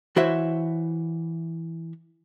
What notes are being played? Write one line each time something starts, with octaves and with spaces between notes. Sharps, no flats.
E3 E4 F#4 C5 C#5 E5